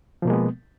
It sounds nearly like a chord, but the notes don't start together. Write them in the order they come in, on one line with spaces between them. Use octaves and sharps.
F3 B2 A#3 G#3 B3